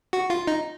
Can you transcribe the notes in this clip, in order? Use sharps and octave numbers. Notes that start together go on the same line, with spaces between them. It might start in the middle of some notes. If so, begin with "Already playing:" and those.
F#4
F4
D#4